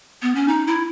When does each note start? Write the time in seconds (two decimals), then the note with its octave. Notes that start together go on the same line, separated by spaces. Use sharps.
0.22 B3
0.35 C#4
0.48 D#4
0.67 E4